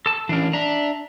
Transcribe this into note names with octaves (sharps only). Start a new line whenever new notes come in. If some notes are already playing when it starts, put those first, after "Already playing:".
A4 A5
E3 C#4 D4 A#4
D4 E5 A#5